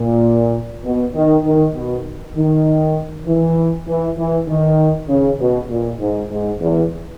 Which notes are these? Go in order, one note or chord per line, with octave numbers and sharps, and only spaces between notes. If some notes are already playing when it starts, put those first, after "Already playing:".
Already playing: A#2
B2
D#3
D#3
B2
D#3
E3
E3
E3
D#3
C#3
B2
A#2
G#2
G#2
E2